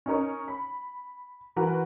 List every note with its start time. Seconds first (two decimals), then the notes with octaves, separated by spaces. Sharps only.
0.06 C#4 D#4 A#4 C#5
0.48 B5
1.56 E3 F#4 A#4 B4